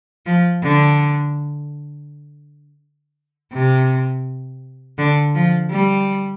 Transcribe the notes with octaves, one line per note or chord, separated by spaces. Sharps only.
F3
D3
C3
D3
F3
G3